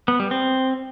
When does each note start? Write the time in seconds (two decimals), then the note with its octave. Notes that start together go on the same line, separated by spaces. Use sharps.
0.08 B3
0.20 G3
0.31 C4